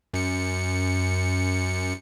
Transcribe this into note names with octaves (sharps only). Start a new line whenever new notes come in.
F#2 C#7